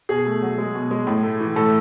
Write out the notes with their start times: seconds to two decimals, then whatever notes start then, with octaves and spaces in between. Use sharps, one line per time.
0.09 B2 G#4
0.26 A3
0.42 F#3
0.58 G#3
0.75 B2
0.91 G#3
1.07 A2
1.23 A3
1.40 E3
1.56 A2 A4